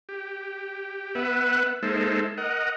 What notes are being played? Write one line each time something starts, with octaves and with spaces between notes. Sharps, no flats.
G4
B3 B4 E5 F#5
G#3 A#3 D#4 A4 C5 E5
A#4 D#5 F#5